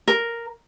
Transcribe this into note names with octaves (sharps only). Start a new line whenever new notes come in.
A#4